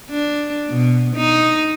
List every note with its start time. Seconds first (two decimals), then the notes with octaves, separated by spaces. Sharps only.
0.10 D4
0.70 B2
1.17 D#4